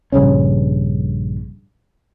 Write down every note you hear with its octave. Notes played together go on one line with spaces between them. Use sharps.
A#1 G2 C#3 C#4